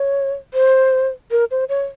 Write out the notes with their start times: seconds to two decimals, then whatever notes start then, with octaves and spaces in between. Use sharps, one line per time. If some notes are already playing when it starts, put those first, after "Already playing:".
Already playing: C#5
0.54 C5
1.31 A#4
1.51 C5
1.69 C#5